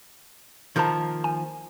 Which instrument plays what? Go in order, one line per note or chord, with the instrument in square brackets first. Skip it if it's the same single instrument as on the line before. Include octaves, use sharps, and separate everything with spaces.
[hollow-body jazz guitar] D#3 F3 A#3 [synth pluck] A5 G6
[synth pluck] G#5